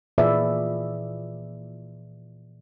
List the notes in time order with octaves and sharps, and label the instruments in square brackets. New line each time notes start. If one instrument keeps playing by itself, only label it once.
[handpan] A#2 E3 G#4 B4 D5 E5